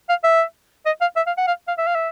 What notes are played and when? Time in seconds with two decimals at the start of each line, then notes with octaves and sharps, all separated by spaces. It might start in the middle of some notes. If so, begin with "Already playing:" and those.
0.09 F5
0.24 E5
0.86 D#5
1.01 F5
1.17 E5
1.27 F5
1.37 F#5
1.47 F5
1.68 F5
1.78 E5
1.87 F5
1.95 E5